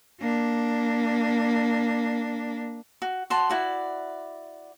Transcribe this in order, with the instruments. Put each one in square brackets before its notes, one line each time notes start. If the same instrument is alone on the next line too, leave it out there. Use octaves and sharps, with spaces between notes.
[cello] A#3 D4
[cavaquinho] F#4
F#4 A5 C6
E4 F#4 D5